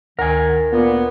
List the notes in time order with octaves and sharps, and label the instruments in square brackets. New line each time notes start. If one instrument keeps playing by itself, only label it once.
[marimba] D2 [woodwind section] D#3 [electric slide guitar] A#4 G#5
[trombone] A#2 [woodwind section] B3